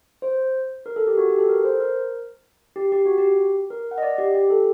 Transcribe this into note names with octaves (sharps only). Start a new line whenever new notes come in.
C5
A#4
A4
G4
F#4
G4
A4
A#4
C5
A#4
G4
G4
F#4
G4
A#4
F#5
D#5
D5
G4
G4
A4